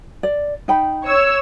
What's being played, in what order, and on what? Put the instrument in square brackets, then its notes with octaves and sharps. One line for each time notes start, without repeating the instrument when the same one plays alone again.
[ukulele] D5
D#4 G5 B5
[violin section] C#5 E6